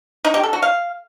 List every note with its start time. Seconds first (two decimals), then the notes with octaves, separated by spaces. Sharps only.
0.25 D#4
0.34 G4
0.43 A4
0.53 F#4
0.62 F5